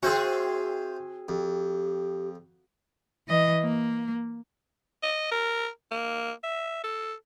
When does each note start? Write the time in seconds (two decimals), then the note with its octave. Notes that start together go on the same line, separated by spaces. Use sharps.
0.03 C4 F4 F#4 G#4 C5 E5
1.28 F2 G4
3.28 E3 D#5
3.63 A#3
5.03 D#5
5.31 A#4
5.91 A#3
6.43 E5
6.84 A4